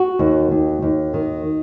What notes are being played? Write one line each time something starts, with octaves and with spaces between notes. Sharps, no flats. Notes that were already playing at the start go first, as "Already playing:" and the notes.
Already playing: F#4
D#2
D#2
D#2
D#3